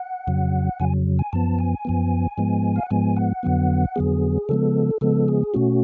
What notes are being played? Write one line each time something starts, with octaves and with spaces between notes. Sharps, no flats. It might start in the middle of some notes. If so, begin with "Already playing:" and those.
Already playing: F#5
F2 C#3 F#3
F2 C#3 F#3 G#5
G#5
F#2 F3 B3 A5
G#5
F#2 F3 B3
G#2 F3 G#3 B3
F5
F#5
G#2 F3 G#3 B3 G#5
F#5
F2 D3 F#3 B3
F2 D3 F#3 B3 G#4
C#3 F3 G#3 B3 A4
C#3 F3 G#3 B3 A4
G#4
B2 A3 C#4 F#4